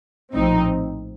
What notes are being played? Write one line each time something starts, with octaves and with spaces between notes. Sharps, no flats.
A#1 A2 F3 C4 D#4